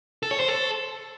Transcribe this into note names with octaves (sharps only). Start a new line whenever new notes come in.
A4
C#5
C5
A4